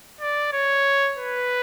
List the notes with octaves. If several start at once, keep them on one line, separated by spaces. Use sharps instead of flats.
D5
C#5
B4